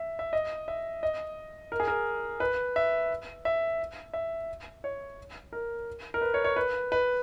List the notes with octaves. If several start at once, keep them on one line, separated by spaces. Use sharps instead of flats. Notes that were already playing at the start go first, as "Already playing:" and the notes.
Already playing: E5
E5
D#5
E5
D#5
A#4
G#4
A#4
B4
E5
E5
E5
C#5
A#4
A#4
B4
C#5
C#5
B4
B4